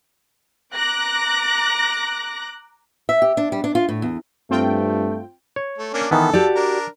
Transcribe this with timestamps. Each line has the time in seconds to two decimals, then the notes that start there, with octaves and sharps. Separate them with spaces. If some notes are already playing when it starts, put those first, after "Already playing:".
0.74 A#5 D6 F#6 A#6
3.09 E5
3.22 G4
3.37 D4
3.52 G3
3.64 D4
3.75 F4
3.89 A2
4.02 E2
4.51 G2 A3 C4 F4 G5
5.56 C#5
5.78 A3
5.94 A#3 C#4 D4
6.11 D#3 E3 B3 A4
6.33 F#4 G4 D5 A5
6.56 D4 A#4